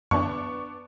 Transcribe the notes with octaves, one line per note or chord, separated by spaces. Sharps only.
F#2 D3 E3 B3 D4 C#6